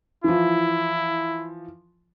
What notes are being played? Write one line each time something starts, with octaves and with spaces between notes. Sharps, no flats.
E3 F3 E4